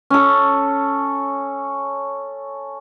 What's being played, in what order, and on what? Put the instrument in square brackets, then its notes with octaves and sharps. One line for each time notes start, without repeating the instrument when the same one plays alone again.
[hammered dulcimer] C#4 A4